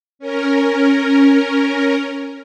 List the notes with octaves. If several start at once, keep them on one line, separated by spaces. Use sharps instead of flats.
C#4 A#4